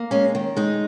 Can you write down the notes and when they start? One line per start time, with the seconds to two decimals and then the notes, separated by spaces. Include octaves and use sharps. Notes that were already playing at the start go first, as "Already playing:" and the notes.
Already playing: A#3
0.11 G#3 C#4
0.35 D#3
0.56 G#3 D#4